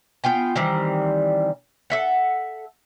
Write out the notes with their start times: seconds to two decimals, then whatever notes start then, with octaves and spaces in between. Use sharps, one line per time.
0.24 B3 F4 G5 G#5
0.56 D#3 E3 G3 C4
1.90 A4 E5 F#5